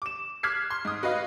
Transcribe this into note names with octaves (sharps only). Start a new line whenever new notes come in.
D6 E7
D6 F6 F#6 G#6 B6 C7
C6
G#2 D#6
F#4 B4 D#5 F5